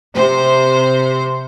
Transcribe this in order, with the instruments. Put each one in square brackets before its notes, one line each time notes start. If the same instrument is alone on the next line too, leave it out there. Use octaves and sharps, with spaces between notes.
[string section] C3 C5